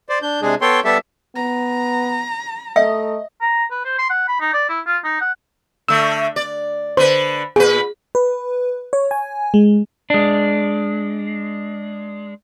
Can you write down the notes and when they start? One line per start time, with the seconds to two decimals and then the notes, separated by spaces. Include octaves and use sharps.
0.09 C5 D5
0.22 D4 G6
0.42 C3 G#3 D4 G#4
0.61 B3 A4 C#5 G5 C6
0.84 G3 B3 G4 A4 E5
1.35 B3 A#5
2.76 A3 D#5 E5
3.42 A#5
3.71 B4
3.85 C5
3.99 C6
4.10 F#5
4.28 B5
4.40 D#4
4.54 D5
4.69 E4
4.86 F4
5.04 D#4
5.21 F#5
5.88 D3 A3 E6
6.36 D5
6.97 D3 B4 C5
7.56 A#2 G#4 B4
8.15 B4
8.93 C#5
9.11 G#5
9.54 G#3
10.10 G#3 D4